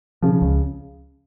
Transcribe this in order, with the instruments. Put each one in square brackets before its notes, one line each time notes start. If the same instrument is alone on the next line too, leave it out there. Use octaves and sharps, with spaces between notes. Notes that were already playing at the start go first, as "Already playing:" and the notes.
[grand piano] C#3 [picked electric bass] F3
[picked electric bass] C#2